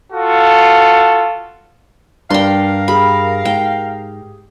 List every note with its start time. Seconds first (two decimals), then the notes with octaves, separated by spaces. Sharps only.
0.13 F4 F#4 A4
2.30 G2 D4 A#4 F5 G5 C6
2.88 G4 G#4 B5
3.45 G#2 G5